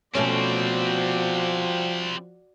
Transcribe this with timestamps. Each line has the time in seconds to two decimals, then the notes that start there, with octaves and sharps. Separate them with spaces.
0.15 B2 F3 G3 A3 C4 C#4 F#4 D5